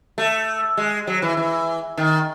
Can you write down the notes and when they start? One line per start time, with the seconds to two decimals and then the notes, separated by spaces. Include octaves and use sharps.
0.18 A3
0.77 G#3
1.07 F#3
1.22 E3
1.37 E3
1.97 D#3